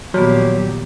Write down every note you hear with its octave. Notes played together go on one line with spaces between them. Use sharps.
A#2 D#3 F3 F#3 B3 G4